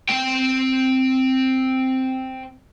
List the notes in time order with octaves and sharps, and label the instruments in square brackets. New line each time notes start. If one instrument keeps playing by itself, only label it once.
[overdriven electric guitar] C4 G5